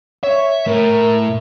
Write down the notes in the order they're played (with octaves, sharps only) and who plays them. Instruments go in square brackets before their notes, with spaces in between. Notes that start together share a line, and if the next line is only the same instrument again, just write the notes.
[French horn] C#5 [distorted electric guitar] E5
[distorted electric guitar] A2 [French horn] A#4